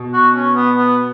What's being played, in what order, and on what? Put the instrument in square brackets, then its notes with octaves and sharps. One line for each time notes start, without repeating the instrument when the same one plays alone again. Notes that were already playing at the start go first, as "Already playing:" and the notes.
Already playing: [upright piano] B2
[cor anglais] F#4
C#4
B3
B3